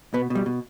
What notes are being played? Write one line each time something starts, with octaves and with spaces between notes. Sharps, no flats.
B2 B3
B2
G3
B2